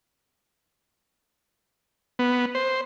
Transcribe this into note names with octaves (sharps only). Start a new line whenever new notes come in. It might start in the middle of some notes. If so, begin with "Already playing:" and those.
B3
C5